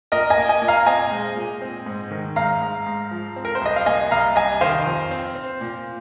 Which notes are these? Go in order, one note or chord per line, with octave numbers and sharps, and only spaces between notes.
A#2 A#4 D#5
D#5 G#5
A#3
D#5 G#5
A#2
F5 A#5
C4 D#5 G#5
G#3
A#2
C4
G#2
D#3
G#2 F5 A#5
G#2
G#2
F3
C4
A#4
C5
C2 D#5
F5
A#3 D#5 G#5
C2 F5 A#5
C2 D#5 G#5
D#3 C5 F5
F2
C4
C4
A#2